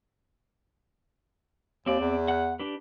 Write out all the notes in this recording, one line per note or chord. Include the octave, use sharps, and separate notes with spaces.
D#2 C4 D5
E2
F#5 F#6
D4 G4 B4